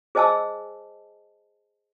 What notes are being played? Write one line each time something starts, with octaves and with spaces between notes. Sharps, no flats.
G#4 C5 D#5 G#5 A5 E6